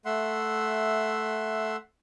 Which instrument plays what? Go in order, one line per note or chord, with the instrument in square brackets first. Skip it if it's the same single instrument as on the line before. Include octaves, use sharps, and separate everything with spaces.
[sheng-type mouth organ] A3 E5 F#5 C6